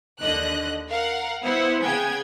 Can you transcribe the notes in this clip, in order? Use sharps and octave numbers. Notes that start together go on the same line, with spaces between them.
D#2 D3 D#5 F#6
A#4 F5 F#5
B3 E4 C5 F#5
C#3 B3 G#4 G5 G#6